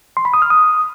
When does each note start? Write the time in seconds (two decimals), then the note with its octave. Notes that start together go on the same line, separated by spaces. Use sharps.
0.17 C6
0.25 B5
0.34 D#6
0.42 F6
0.50 D#6